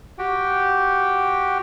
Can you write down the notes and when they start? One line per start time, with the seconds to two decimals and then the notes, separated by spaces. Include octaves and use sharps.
0.18 F#4 G4 G5